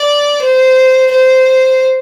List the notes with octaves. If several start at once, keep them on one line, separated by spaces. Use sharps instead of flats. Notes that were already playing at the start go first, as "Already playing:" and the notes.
Already playing: D5
C5
C5